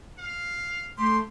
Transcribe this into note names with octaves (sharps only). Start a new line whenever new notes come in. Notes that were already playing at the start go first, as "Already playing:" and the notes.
F5
A3 G4 C6